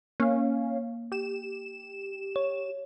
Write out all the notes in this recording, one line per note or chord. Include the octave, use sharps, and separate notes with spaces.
A#3 C#4 F5
G4 E7
C#5